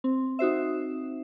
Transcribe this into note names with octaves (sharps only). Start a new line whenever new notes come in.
C4
D#4 F#4 C5 E5